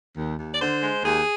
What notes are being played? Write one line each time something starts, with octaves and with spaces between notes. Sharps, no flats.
D#2
D#2
D5
D3 C5
G#3
D#2 G#4